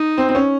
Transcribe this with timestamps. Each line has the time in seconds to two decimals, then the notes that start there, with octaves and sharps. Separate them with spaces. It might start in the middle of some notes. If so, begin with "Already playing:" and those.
Already playing: D#4
0.18 C4
0.29 C4
0.35 C#4